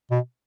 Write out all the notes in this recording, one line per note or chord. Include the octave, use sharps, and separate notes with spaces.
B2